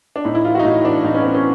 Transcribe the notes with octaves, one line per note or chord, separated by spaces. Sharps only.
D4
A2 D#4
E4
E3 F4
F#4
D#4
A2 E4
E3 D4
A2 D#4
C#4
B3
E3 C4
C#4